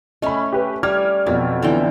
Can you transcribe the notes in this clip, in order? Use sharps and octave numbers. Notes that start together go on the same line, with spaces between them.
A3 C#4 D#5 B5
G4 B4
G3 D6 F6 G#6
F2 B2 F#3
D3 E3 G5